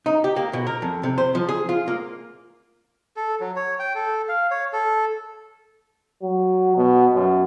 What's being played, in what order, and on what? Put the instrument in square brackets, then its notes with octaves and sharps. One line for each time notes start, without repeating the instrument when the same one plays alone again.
[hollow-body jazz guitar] D#4
G4
A#3
B2
A#4
F2
C3
C5
F3
G#4
F4
A#3
[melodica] A4
F#3
C#5
G5
A4
F5
C#5
A4
[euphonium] F#3
B2
F#2